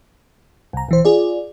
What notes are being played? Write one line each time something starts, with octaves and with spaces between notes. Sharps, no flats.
C2 A#5
B1 E3 C5
F4 G#4 D5